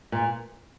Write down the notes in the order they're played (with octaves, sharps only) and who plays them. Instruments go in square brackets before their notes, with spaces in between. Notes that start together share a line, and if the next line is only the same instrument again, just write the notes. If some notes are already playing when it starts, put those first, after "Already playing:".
[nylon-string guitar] A#2